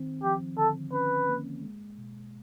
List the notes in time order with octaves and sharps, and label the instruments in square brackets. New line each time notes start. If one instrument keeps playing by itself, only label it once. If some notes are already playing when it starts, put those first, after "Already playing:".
Already playing: [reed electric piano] D#3 C4
[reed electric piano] F3 [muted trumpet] G4
[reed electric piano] D3 [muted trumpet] A4
[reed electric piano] C#4 [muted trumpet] B4
[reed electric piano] A#3
G#3
B2